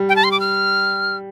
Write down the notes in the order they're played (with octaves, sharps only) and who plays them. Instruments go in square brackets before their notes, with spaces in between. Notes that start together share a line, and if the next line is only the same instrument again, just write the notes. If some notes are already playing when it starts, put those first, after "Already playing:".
Already playing: [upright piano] G3
[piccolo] G5
A5
C6
D6
F6